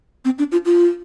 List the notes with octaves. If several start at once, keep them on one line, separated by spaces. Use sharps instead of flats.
C4
D4
F4
F4